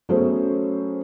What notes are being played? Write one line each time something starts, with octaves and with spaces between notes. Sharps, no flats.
F#3 A3 B3 C#4 G#4 C5